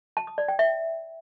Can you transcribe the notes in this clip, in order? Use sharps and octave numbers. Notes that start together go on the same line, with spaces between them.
A5
D#6
D5
G5
E5